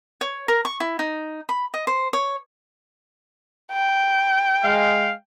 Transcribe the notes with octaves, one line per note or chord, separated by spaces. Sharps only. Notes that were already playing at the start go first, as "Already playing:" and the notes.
C#5
A#4
C#6
E4
D#4
B5
D#5
C5
C#5
G5
G#3 F5